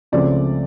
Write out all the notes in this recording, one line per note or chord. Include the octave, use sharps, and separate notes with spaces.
C#2 C#3 F3 A3 C4 D5